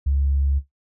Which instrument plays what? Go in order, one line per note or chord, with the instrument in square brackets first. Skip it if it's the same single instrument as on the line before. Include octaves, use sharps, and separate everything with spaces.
[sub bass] C#2